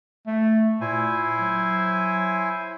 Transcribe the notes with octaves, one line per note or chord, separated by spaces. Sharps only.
A3
A#2 E4 C5 G#5
F#3